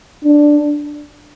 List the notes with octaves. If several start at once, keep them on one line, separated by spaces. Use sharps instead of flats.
D4